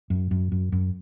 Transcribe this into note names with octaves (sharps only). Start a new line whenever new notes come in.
F#2
F#2
F#2
F#2